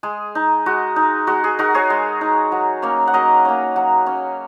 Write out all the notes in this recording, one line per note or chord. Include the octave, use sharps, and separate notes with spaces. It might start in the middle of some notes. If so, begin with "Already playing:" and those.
G#3 G#4
D#4
G#3 F#4
D#4
G#3 F#4
G#4
D#4 F#4 A#4
G#4 C#5
G#3
D#4
F#3
A#3 C#4
F#5
F#3 A#4 D#5
A#3 C#4
F#3
C#4